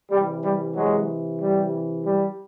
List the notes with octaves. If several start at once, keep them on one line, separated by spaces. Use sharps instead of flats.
C3 E3 G3
G3
F#3 G#3
G3
G3